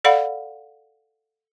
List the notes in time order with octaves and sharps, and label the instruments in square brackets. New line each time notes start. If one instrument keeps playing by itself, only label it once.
[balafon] A4 D5 F5 F#5 B5